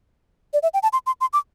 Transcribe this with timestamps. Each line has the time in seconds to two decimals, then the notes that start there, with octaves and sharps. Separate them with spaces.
0.54 D5
0.63 E5
0.74 G5
0.83 A5
0.93 C6
1.07 C6
1.21 C6
1.33 D6